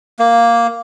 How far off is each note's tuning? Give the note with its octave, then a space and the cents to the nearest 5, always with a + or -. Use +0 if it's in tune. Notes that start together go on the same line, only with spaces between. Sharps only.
A#3 +0